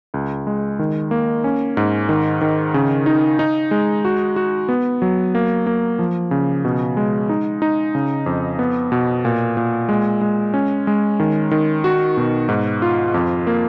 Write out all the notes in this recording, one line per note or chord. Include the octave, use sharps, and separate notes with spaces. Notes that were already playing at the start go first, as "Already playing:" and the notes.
C#2
G#3
D#3
A#3
C#4
G#2
D#3
D#3
C#3
D#4
D#4
G#3
F#4
F#4
B3
F#3
A#3
A#3
F3
C#3
B2
G#3
D#4
D#4
C#3
F2
B3
B2
A#2
A#2
G#3
G#3
C#4
G#3
D#3
D#3
F#4
B2
G#2
F4
F2
A#3